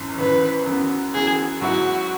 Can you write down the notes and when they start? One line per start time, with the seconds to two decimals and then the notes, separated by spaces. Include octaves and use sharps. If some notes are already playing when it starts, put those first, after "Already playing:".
Already playing: G#1 F#2 E3
0.18 G#1 F#2 E3 B4
0.66 F#2 E3 B3 F#4
1.14 F#2 E3 B3 F#4 G#4
1.62 G#2 F#3 B3 E4 F#4